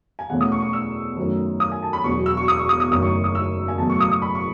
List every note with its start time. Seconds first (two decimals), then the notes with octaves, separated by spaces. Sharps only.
0.19 G#5
0.29 E2 B2 A3 C#4 F#5
0.41 D#6
0.52 C#6
0.62 C#6
0.73 E6
1.17 F#2 D#3 F#3 A3 C#4
1.60 D#6
1.72 G#5
1.83 A5
1.93 B5
2.04 E1 E2 B2 F#3 C#6
2.26 E6
2.37 C#6
2.48 D#6
2.59 C#6
2.69 D#6
2.80 D#6
2.91 F#1 F#2 D#3 A3 C#4 D#6
3.02 C#6
3.24 D#6
3.35 E6
3.68 G#5
3.78 F#1 E2 B2 F#3 A3 A5
3.90 C#6
4.00 D#6
4.12 D#6
4.22 B5
4.35 C#6